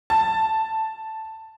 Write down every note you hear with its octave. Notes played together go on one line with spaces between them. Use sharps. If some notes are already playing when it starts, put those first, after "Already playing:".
A5